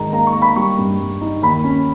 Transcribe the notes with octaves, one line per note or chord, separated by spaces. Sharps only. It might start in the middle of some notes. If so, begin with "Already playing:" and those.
Already playing: G#2 D#3 A#5
A#3 A#5
C#6
A#3
B5
G3 C#6
G2
G2
D#4
D#2 B5
C#4